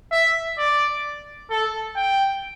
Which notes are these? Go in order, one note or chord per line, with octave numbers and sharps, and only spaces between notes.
E5
D5
A4
G5